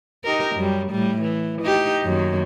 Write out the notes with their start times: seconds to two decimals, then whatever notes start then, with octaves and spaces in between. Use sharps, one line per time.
0.24 D#4 G4 A#4
0.55 F#2 G3
0.91 A2 G3
1.22 E3
1.62 D#4 G4
2.04 F#2 D#3 A#3